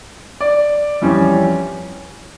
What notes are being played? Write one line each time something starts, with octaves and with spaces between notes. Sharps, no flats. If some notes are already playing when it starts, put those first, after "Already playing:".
D5
F2 E3 G3 C#4